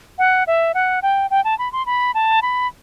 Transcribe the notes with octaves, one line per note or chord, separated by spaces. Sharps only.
F#5
E5
F#5
G5
G5
A5
B5
C6
B5
A5
B5